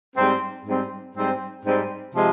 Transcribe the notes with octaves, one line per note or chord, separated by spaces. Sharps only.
G#2 G3 C4
G#2 G3 C4
G#2 G3 C4
G#2 G3 C4
C3 F3 G#3